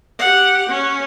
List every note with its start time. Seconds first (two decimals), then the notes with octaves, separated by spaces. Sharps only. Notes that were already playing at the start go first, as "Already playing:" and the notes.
0.19 G4 F#5
0.70 C#4